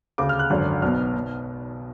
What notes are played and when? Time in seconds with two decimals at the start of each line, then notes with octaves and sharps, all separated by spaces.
0.18 D2 C#3 D6
0.29 F6
0.39 F#6
0.50 G#1 F#2 D3
0.82 B1 B2 F6
1.16 B2